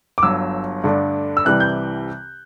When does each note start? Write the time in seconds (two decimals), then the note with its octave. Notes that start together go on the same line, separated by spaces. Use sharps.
0.18 D6
0.23 G1 G2 F#3 E6
0.84 G2 D3 A3 D4
1.37 E6
1.45 C2 C3 E3 G3 F#6
1.60 G6